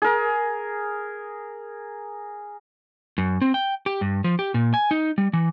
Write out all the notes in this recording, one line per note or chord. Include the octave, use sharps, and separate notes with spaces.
G#4 A#4
F#2
C4
G5
G4
G2
F3
G4
A#2
G#5
D#4
G3
E3